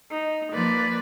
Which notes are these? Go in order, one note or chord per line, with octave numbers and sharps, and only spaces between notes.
D#4
F3 A#3 B4 D5